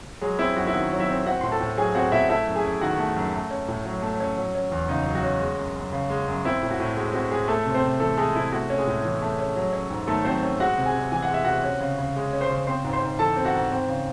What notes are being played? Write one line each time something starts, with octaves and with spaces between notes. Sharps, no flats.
F#3 G#3 G#4
C4 E4
F#2 F#4
E4
D#3 F#4
F#3
E4 E5
C4
C4 F#4 F#5
A2 C6
A4 A5
A2
F#3 G#4 G#5
C4 F#4 F#5
A2 E4 E5
A3 E4 E5
F#2
G#4 G#5
F#2
D#3 F#4 F#5
A3
F#2
A3
C#4
A2
F#3
A3
C#4
F#3
C#4
E2
C#3 D#4 D#5
F#3
F#4
C#4
G#3
F#2
F#2
C#3
G#3
F#2
C4 E4
A2
F#4
A2
G#3 F#4
C4 F#4
A2 G#3 G#4
A3 A4
C3
C4 C5
C3
E3 A3 A4
G#3 A3 G#4
C3 E4
A3 F#4
C#4
G#3 G#4
A2
E3
A3
C#4
F#3
C#4
G#2
D#3 A3 A4
F#3 C4 C5
C#4
G#3 F#4 F#5
C3
G#4 G#5
C3
E3 G#5
F#5
G#3 E5
C3 F#4 F#5
C#4
C#3
C#3
G#3
C#4
C5 C6
C#3
C4 C5 C6
G#2
C5 C6
G#2
E3 A4 A5
C4
F#4 F#5
G#2
C4
C#3